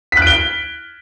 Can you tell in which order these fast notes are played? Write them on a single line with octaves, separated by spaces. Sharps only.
B6 F#6 D7 G7